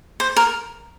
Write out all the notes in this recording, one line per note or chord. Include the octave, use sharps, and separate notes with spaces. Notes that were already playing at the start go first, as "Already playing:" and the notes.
C5
A#4